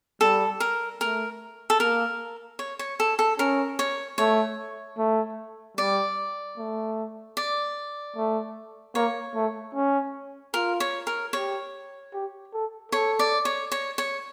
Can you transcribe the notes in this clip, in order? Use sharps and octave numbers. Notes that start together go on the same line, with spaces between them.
G3 A4
A#4
A3 A#4
A4
A#3 A#4
C#5
C#5
A4
A4
C#4 A#4
C#5
A3 C#5
A3
G3 D5
A3
D5
A3
A#3 C#5
A3
C#4
F4 A#4
C#5
A#4
G4 C#5
G4
A4
A4 C#5
D5
C#5
C#5
C#5